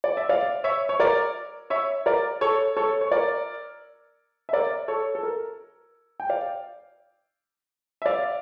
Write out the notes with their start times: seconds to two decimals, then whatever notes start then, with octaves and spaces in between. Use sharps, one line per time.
0.04 D5
0.17 E5
0.29 D5 F5
0.64 C#5 E5
0.89 C#5
1.00 A#4 D5
1.70 C#5 E5
2.06 A#4 D5
2.41 A4 C#5
2.77 A4 C#5
3.01 C#5
3.12 A#4 D5
4.49 E5
4.53 A#4 D5
4.88 A4 C#5
5.15 A4
5.23 A#4
6.20 G5
6.29 D5 F5
8.02 E5
8.06 D5 F5